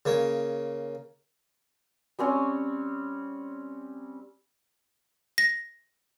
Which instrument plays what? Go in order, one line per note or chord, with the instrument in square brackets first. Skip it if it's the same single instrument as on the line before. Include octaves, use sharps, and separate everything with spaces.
[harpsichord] C#3 A#3 C#5
[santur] G3 C4 C#4 C#5
[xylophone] A#6